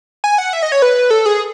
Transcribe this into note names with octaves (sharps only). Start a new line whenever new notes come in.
G#5
F#5
E5
D#5
C#5
B4
A4
G#4